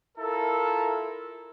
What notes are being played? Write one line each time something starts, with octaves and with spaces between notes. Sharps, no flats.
E4 F4 A4 A#4